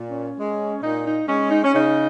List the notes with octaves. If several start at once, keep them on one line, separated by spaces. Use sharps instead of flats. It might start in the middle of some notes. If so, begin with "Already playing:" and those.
Already playing: A#2
C#4
G#3
A#2 D#4
D#4
G#3 C#4
D#4
C#4
C#3 D#4